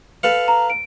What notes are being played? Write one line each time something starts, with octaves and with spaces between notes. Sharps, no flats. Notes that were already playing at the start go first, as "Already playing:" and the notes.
A4 B4 F5 C#7
A#5
D7